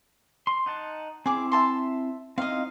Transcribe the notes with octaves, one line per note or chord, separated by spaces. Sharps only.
C6
D#4 F#5 A5
C4 E4 G#4 D6
E5 A5 C6
C4 D#4 E4 D#5 F5